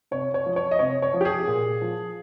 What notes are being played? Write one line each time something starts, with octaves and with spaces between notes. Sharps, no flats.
C3 C#5
C#5
F3
C#5
D#5
C3 C#5
C#5
F3
G4
G#4
A#2
F3